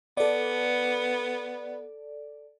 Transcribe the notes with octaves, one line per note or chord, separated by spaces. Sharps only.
B3 A4 D5